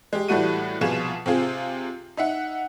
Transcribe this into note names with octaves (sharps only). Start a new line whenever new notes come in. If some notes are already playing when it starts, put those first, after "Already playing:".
G#3 G4
A2 E3 G3 A3 F#4 D#7
C2 B2 F3 F4 G#4 E7
C3 C4 F4 G#4
D#4 E5 F#5